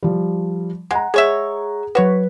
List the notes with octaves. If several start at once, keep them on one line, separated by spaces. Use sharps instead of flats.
F3 G3
G#3 F#5 A#5
G#3 G#4 C#5 E5
F#3 F#4 B4 C#5